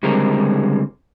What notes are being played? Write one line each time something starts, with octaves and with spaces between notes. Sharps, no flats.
C#2 D3 G3 G#3 C4 A#4